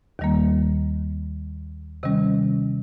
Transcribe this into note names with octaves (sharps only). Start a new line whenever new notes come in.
D#2 D#3 G3 A#3
C3 D#3 G3 C#4